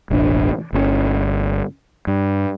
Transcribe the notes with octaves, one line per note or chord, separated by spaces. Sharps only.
E1 A1 C#4 D4
G1 A#2 C#4
G2